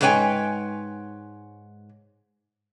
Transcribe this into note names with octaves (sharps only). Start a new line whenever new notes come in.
G#2 G#3 B4 C#5 G5 G#5